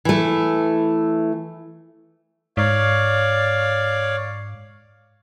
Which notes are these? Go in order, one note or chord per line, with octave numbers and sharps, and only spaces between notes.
E3 A3
G#2 C#5 D5 F5